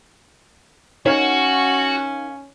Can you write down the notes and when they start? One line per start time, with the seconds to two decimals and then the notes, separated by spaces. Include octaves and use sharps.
1.06 C#4 D#4 F#4 A#4 C#5 F5